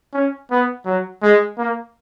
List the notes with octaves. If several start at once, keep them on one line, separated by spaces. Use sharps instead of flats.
C#4
B3
F#3
G#3
A#3